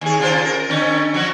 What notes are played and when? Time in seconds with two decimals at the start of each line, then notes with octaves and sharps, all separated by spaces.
0.01 D#2 G#4
0.20 C#3 F4 C5
0.45 A#4
0.70 D3 C#4
1.14 F3 F#3 F#4